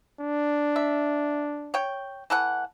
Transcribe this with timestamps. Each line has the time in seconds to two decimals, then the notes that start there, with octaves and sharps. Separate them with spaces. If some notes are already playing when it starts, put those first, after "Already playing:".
0.21 D4
0.76 E5
1.74 C#5 G5
2.30 E3 A4 F#5